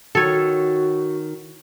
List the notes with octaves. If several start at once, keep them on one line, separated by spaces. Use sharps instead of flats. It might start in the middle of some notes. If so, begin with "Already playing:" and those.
D#3 F#4 A4 C#5